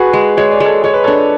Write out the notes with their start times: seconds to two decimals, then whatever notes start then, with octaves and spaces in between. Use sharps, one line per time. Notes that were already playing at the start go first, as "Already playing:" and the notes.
Already playing: F#4 G#4 B4
0.13 G#3
0.37 G#3 C#5
0.51 D5
0.60 G#3 A4 C#5
0.84 G#3 C#5
0.94 B4
1.04 D4 A4 C#5